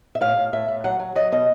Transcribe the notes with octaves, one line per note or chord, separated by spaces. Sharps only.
E5
A2 F5
A2
A2 E5
A2
F#3 F#5
F#3
F#3 D#5
B2 D#5